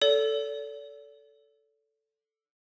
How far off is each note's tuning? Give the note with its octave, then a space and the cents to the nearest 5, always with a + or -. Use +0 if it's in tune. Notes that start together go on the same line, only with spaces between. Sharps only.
A4 +0 D5 -45